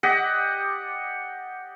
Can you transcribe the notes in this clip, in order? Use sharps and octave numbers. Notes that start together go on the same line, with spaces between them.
G4 D5 D#5 F#5